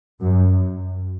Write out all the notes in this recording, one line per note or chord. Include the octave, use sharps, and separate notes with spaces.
F#2